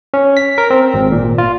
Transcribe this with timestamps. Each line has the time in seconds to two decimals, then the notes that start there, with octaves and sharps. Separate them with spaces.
0.14 C#4
0.37 B6
0.58 A#4
0.70 C4
0.94 G#1
1.12 A#2
1.38 F4